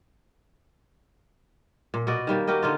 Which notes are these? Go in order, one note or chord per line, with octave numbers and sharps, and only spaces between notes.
A#2
B2 F#4 D5 D#5
D#3 G3 A#3
F#4 G4 A#4 D#5
D3 D#4 F4